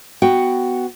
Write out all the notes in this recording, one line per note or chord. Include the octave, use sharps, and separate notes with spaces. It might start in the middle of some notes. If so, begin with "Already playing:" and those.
B3 F#4 F#5 G5